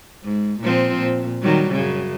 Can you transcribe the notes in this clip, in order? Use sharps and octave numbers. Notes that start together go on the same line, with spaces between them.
G#2
A#2 F3 C4
A#2
D#3 F#3 G3
F#2 C#3